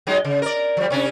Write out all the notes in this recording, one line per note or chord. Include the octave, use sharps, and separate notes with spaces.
F#3 G#3 D#4
C#3
A#4 D5
F3 G3
C3 C#4 D4